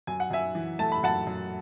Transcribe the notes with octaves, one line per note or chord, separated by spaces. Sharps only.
F#2 G#5
F#5
F#2 E5 G#5
E3
A3 A5
B5
F#2 F#5 A5
F#2